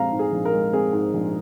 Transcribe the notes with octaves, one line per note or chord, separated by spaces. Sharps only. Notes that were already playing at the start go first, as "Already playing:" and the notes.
Already playing: A#1 G#3 C4 F5 A#5
G#2
G#4
A#1
A#4
G#3
C4 G#4
G#2
A#1